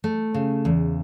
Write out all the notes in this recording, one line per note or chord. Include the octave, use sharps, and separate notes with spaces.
A3
C#3
E2